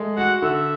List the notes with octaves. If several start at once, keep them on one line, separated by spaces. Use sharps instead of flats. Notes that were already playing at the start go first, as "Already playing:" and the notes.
Already playing: G#3 A3
F#4 F#5
D3 E5